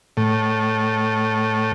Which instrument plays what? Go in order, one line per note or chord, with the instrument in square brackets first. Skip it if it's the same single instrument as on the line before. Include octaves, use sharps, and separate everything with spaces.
[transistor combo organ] A2